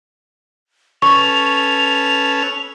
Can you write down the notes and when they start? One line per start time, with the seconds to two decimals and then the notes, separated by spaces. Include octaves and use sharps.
1.02 C#4 A4 B4 C#6 F7